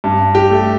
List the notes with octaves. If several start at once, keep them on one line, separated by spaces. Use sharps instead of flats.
G2
G4
A3